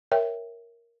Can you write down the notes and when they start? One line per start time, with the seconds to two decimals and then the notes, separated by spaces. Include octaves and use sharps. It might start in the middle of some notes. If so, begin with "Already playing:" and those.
0.12 A#4 C#5 E5 G5